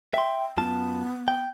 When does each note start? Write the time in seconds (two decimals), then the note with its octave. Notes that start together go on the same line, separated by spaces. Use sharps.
0.14 E5 G5 C6
0.57 F#2 B3 F4 A5
1.28 G5